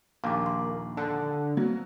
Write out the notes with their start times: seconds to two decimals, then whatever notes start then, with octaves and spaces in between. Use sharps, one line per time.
0.24 A#1 D#2 A#3 F5 D6
0.46 C6
0.97 D3 A4 A5 F#6
1.57 F#3 B3 C4